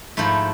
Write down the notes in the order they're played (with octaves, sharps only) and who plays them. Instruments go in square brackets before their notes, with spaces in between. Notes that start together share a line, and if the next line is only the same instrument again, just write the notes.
[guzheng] G#2 F3 A3 E4